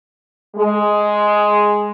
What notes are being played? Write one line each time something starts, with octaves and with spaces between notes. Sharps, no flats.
G#3